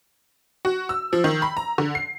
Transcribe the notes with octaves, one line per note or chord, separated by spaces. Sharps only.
F#4
E6
F3
D#3
B5
A#5
D3
C7